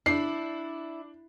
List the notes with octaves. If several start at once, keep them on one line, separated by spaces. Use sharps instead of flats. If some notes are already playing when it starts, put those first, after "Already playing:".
D4 E4 C7